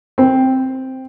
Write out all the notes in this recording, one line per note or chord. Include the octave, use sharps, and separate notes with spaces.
C4